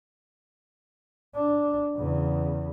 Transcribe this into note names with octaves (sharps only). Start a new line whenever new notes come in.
D4
E2 C#3